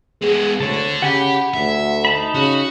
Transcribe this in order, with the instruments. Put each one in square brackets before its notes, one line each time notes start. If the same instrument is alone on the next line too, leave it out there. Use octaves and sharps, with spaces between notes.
[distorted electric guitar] G#3 B3 [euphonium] G#4
[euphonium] D2 [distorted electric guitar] D3 [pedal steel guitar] C#5 A5
[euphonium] C#3 [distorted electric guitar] G4 [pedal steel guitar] F#5 G#5 B5
[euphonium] D2 [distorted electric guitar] E5
[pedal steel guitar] D#4 A5 B5
[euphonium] C#3 [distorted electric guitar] F#4